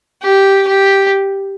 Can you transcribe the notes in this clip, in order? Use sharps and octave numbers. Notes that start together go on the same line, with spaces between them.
G4
G4